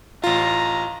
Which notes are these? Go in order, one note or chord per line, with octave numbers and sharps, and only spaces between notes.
A1 F4 A#5